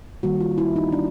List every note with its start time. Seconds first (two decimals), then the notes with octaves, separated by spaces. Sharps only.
0.23 D#3 G3 A#3 F#4
0.40 F4
0.58 E4
0.76 D#4
0.93 D4